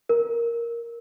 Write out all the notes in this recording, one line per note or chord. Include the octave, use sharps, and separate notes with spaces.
A#4